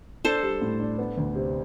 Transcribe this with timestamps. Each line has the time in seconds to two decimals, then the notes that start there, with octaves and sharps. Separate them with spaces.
0.25 D4 A4 C5
0.43 G3
0.61 A2
0.80 D4
0.98 B3
1.17 D2
1.35 C3